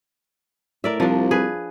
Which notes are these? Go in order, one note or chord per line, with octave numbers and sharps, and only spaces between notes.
A2 A#4 D5 E5
C2 F3 D4
G#4 B4